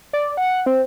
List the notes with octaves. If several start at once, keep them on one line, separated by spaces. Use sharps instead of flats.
D5
F#5
C4